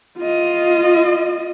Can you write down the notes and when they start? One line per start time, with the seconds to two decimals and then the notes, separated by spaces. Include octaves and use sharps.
0.18 F4 D#5